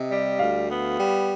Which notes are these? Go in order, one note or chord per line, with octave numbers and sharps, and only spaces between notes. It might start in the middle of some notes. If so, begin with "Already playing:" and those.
Already playing: C3 D#5
G3
D2 F5
B3
G3